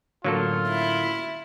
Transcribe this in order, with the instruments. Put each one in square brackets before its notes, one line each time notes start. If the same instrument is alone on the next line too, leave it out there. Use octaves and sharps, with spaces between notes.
[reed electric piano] A2 D3 C#4 [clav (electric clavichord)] F#3 A#3 A4 [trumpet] F4
[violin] E4